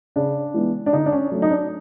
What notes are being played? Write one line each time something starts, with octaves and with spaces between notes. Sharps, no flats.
C#3 D4
E3 G#3 B3
D4
D3 D#4
D4
C#4
F#3 A3
D#4
D4